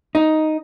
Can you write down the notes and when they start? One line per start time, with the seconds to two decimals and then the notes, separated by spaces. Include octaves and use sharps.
0.15 D#4